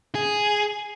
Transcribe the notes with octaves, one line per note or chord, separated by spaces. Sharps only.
G#4